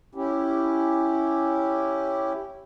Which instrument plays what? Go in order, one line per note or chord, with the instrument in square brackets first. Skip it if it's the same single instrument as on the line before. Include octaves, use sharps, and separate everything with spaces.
[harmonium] C#4 E4 G4